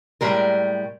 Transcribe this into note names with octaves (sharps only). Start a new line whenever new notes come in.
A2 G3 G#3 A#4